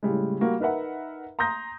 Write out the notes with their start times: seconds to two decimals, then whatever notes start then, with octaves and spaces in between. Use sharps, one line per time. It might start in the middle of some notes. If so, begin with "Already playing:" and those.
0.03 A2 C#3 G3 G#3
0.41 G3 A#3 F#4
0.60 D#4 A#4 B4 E5 F#5
1.39 A#5 C6 D#6 G6 A#6